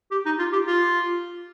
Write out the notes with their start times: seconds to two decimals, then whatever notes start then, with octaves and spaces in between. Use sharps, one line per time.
0.11 G4
0.26 D#4
0.39 F4
0.53 G4
0.67 F4